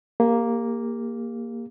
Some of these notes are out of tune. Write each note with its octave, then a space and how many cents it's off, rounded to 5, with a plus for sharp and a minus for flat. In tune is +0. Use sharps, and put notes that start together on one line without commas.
A#3 +0 G4 +40